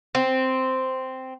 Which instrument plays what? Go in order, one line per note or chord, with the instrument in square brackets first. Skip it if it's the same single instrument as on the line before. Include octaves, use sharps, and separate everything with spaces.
[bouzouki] C4